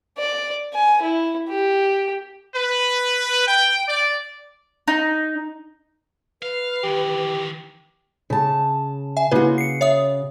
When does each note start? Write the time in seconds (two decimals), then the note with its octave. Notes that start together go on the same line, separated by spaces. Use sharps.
0.18 D5
0.73 G#5
1.02 E4
1.49 G4
2.54 B4
3.47 G5
3.88 D5
4.88 D#4
6.42 B4 F5
6.83 D#3 E3 G4
8.30 C#3 A5
9.17 E5 G#5
9.31 C#3 A#3 E4 F#4 B4
9.58 C7 C#7
9.81 C#5 E5 D#6